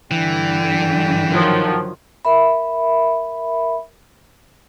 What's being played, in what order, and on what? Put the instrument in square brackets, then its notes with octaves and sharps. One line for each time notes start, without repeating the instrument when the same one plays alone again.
[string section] G2 D3 [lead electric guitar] E3 [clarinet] G5
[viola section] D#3 F3 F#3
[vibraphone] A#4 E5 B5